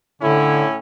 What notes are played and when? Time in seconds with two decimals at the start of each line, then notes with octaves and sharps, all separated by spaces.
0.22 A2 D3 C#4 E4